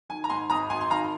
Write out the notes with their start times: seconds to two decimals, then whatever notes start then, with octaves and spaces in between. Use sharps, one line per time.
0.09 D#3 G#5
0.24 A#5
0.30 G#2 G#5 C6
0.50 G#1 A#5 D#6
0.70 G#1 G#5 C6
0.81 C6
0.90 D#3 F5 A#5